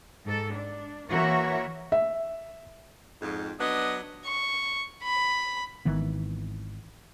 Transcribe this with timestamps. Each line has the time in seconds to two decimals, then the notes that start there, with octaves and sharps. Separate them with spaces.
0.24 G#2 A4
0.54 D4
1.09 E3 A#3 F#4 A#4 C#5 E5
1.92 E5
3.21 F2 G#2
3.60 F#3 B3 D4 D#5
4.26 C#6
5.03 B5
5.85 G#1 D#3 E3 B3